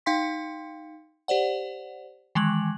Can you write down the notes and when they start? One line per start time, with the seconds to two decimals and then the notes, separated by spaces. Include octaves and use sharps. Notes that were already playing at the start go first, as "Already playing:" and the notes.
0.06 D#4 F5 G5 C6 B6
1.28 G4 C5 D5 F#5
2.35 D#3 E3 G#3 G#6 F#7